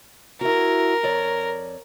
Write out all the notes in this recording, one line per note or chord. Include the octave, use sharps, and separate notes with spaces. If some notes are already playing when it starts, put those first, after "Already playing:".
E4 F#4 A#4
F2 C#5 D5